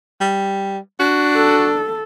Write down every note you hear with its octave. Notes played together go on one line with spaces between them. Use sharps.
G3
D4 F#4
A4